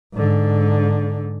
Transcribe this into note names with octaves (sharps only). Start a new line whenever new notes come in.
G#2 D3